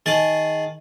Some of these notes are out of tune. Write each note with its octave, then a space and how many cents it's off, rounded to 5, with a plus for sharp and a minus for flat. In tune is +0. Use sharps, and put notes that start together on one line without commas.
D#3 +10 G#4 +0 A5 +0